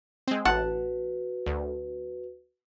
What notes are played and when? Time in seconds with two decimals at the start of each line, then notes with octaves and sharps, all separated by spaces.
0.28 G#3 C4
0.45 A1 F#4 B4 F#5 A5
1.46 D2